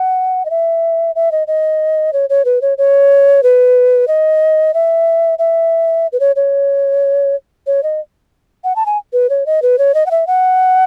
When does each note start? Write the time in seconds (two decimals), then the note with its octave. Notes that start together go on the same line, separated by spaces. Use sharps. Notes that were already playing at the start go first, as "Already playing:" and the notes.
Already playing: F#5
0.45 D#5
0.50 E5
1.15 E5
1.32 D#5
1.47 D#5
2.13 C#5
2.30 C#5
2.45 B4
2.62 C#5
2.78 C#5
3.43 B4
4.08 D#5
4.74 E5
5.39 E5
6.12 B4
6.20 C#5
6.36 C#5
7.67 C#5
7.83 D#5
8.64 F#5
8.76 A5
8.86 G#5
9.13 B4
9.30 C#5
9.46 D#5
9.62 B4
9.79 C#5
9.94 D#5
10.06 F#5
10.11 E5
10.27 F#5